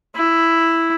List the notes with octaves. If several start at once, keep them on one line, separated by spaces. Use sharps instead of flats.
E4